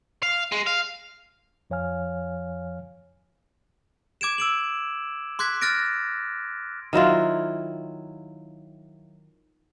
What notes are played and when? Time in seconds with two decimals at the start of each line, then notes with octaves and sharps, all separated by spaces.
0.23 F5
0.52 G#3
0.66 F5
1.70 F2 F3 C#5 F5 G#5 F6
4.21 D6 G#6 D7 E7
4.38 E6 D7 F#7
5.39 C6 D6 F#6 G#6 B6
5.62 F6 F#6 A6 A#6 D7
6.93 D#3 F#3 E4 F4